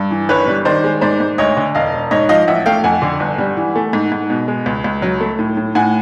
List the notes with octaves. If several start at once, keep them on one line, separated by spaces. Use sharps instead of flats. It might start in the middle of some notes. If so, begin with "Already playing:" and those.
Already playing: G2
E3
G1 B4 C#5
G3
D#3 C5 D5
G#3
G#2 C5 D5
G#2
D2 C#5 D#5
D3
E1 D#5 F5
E1
G#2 C#5 D#5
F3 D#5 F5
A1 E5 F#5
A3 F5 G5
F2 F#5 G#5
D3
G1
G3
E3
A3
G#2
G#2
B2
G#3
C#2
C#2
F#3
A3
A2
A2
A2 F#5 G#5